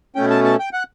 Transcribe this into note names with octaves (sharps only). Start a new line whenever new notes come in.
B2 A3 C#4 G5
A5
A5
G5
F#5